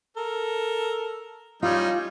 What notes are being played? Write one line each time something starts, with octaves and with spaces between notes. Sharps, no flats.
A4 A#4
G3 C#4 D#4 F4